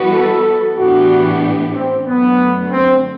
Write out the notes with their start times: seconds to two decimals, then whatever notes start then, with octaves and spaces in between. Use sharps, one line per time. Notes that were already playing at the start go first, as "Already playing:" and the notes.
Already playing: E3 G3 B3 F#4 B4
0.12 A4
0.76 A2 E3 B3 D4 F#4 G4
1.74 C4
2.06 F#2 D3 F#3 A3 B3
2.71 C4